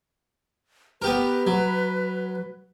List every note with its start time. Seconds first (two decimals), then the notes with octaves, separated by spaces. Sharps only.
1.02 B3 G4 A#4 B4
1.47 F#3